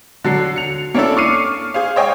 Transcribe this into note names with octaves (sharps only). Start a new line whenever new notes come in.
D3 F#3 C7
C#7 F7
A#3 C#4 D4 E4 A4
C#6 D6 F6 C7 C#7 D#7
G#4 C5 F5
C5 C#5 D#5 G5 G#5 C#6